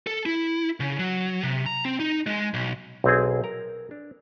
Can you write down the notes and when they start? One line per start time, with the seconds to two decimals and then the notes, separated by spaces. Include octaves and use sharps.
0.07 A4
0.26 E4
0.80 C#3
0.99 F#3
1.43 C3
1.66 A#5
1.85 C4
2.00 D#4
2.26 G#3
2.54 B1
3.04 B1 C4 G#4
3.44 A#4 A#5
3.91 D4